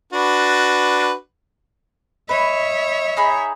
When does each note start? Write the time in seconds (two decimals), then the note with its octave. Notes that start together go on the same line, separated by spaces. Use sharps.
0.13 D4 F#4 B4
2.29 B4 C#5 D#5 E5
3.17 D#4 G#4 B5